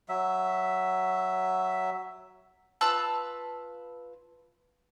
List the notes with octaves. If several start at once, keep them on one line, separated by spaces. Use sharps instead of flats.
F#3 E5
F4 B4 A5 E6